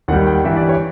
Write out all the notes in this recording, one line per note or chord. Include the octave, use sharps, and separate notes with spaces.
D#2 D#3 G3 F#5
G5
G2 E3 G3 E5
D5
C#5